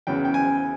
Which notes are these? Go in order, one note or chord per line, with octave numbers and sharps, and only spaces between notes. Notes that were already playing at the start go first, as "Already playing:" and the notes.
E2 C#3 F#3 B3 G5
G5
G#5